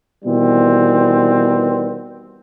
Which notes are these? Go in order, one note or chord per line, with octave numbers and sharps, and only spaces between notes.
B2 D#3 E3 G3 B3 C4